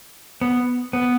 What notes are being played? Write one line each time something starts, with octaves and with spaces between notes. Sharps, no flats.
B3
B3